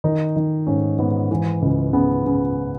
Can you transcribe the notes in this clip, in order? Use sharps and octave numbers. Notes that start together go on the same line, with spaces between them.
D#3 D#4
D#3
G#2 C#4
G#2 B3
E3
C#2
C#3 B3
C#3